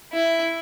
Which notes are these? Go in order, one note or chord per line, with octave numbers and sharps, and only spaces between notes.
E4